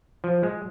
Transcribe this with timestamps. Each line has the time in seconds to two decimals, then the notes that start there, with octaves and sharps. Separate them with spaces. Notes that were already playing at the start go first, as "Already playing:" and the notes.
0.24 F3
0.43 G#3